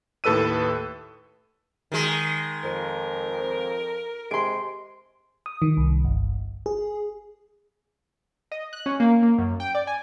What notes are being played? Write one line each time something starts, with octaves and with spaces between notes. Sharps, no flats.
D#2 A2 A4 B4 E6 D#7
D#3 G#3
F2 A#4
C3 G#3 C6 D7
D#6
D#3
C2
G1
G#4
D#5
F#6
C#4
A#3
A#3
F#2
G5
D5
G#5